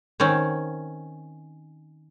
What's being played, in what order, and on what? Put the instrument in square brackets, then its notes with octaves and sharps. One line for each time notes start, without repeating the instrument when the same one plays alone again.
[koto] D#3 C4 C#4